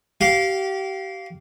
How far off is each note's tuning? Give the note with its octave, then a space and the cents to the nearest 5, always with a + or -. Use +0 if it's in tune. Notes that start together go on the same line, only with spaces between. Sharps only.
G4 -30 F5 -5